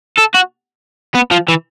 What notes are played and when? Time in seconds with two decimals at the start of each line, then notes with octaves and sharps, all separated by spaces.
0.18 A4
0.34 F#4
1.15 B3
1.31 F3
1.49 E3